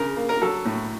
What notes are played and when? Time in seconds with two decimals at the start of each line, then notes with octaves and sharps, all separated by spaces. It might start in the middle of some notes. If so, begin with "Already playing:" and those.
Already playing: C#3 A#4
0.17 A#3
0.29 A#4
0.41 F#3 A4
0.65 A2